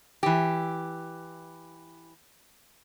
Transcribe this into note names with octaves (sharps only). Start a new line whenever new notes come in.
E3 G4